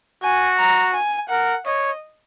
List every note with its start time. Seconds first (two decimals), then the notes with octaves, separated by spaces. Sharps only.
0.23 F#4 G#5
0.59 A#5
0.94 G#5
1.30 A#4 F#5
1.66 C#5 D#5